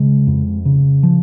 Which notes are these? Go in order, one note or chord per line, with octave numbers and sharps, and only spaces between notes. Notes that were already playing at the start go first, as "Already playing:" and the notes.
Already playing: C#3 G#3
F2
C#3
F3